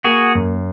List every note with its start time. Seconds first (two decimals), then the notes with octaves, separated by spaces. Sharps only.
0.04 A#3 F#4 G#4
0.35 F#2